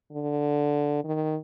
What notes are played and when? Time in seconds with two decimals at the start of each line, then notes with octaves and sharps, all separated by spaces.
0.12 D3
1.04 D#3